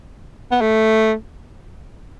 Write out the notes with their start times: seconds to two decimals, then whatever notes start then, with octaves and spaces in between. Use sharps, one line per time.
0.51 B3
0.61 A3